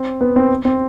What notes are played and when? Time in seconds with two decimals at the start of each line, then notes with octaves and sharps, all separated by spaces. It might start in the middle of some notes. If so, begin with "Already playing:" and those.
Already playing: C4
0.21 B3
0.36 C4
0.65 C4